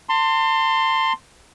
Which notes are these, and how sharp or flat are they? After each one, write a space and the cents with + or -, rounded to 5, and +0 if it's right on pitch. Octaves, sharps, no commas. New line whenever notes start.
A5 +35 C6 +0